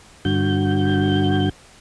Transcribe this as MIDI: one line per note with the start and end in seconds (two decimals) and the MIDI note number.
0.25 1.49 43
0.25 1.49 50
0.25 1.49 66
0.25 1.49 91